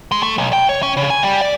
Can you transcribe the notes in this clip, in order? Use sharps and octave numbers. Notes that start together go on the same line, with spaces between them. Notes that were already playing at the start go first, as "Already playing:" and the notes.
G#3
A3
B1
G5
C#5
C#4
C#3
G#5
G3
D5